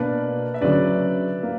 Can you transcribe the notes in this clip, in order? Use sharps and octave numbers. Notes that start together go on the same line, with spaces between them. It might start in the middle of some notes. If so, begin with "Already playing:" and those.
Already playing: B2 A#3 D4 B4 D5
E5
D2 C#3 F#3 C#4 B4 D5
A#3